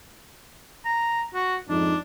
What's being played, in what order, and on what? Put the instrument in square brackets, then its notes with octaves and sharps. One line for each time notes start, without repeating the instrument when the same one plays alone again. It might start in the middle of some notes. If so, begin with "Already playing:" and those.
[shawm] A#5
F#4
[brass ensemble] F2 G#2 D#4 [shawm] D4